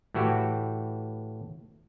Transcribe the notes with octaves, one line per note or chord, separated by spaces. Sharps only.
A2 E3 F#4 G4